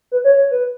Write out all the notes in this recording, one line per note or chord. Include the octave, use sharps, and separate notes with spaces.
B4
C#5
C#5
B4